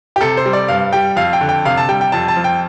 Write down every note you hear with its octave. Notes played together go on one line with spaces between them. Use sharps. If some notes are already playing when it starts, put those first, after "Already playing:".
G4
C3 A4
C5
G3
D5
G2 F5
G3 G5
F2 F5
G5
D3
G5
C3 F5
A5
G3 G5
G5
F2 A5
A5
F3
G5